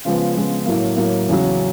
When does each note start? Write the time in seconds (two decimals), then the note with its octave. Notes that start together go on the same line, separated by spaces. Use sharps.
0.05 C#3 F3 G#3 B3
0.35 C#3 F3 G#3 B3
0.66 A2 F#3 A#3
0.96 A2 F#3 A#3
1.28 E2 C#3 F#3